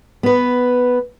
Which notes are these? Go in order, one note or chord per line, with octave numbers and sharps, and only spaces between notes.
B3 B4